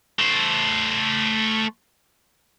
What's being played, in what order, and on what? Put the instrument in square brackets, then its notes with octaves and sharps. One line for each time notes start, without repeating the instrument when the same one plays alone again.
[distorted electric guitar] A3 C5